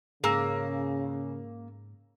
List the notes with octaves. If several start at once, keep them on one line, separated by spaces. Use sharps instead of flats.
G#2 C#3 A#3 G#4 A#5 E6